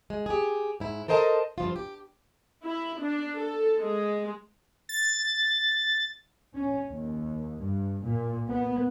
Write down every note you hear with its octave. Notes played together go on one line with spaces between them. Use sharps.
G#3
G4 G#4
G#2 E4
A4 A#4 C5 D#5 G#5 A5
G2 F3 F4
G4
E4
D4
A4
G#3
A6
C#4
D#2
G2
A#2
B3